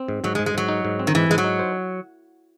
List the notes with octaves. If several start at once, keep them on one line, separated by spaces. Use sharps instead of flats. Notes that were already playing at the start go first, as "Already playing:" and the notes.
Already playing: C4
G#2
G#2 F#3
G#3
G#2
G#3
G#2 F#3
D#4
G#2
C4
D#3
G#2 E3
G#2 G#3
F#3
D#4
C5